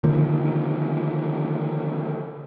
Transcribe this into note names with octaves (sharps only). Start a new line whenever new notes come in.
D3 D#3 F3 A#3